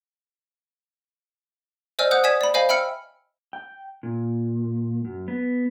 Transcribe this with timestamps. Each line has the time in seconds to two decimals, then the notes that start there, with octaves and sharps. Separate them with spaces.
1.99 C5 D5 D#5 G#5 E6 F6
2.11 C5 F#5 D#6 F#6 G6
2.24 D5 G#5 D#6 G#6 B6 E7
2.41 D5 B5
2.54 C5 D#5 F5 G#5 B5
2.69 E5 G5 B5 E6 F6 C#7
3.53 G5
4.03 A#2
5.05 F#2
5.28 B3